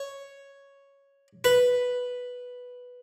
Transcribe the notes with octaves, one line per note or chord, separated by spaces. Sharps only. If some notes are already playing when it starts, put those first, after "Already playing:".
Already playing: C#5
B4